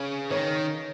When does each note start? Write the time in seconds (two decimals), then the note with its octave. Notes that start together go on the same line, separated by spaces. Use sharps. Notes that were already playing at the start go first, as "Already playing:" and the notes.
Already playing: C#3 C#5
0.30 D#3 C#5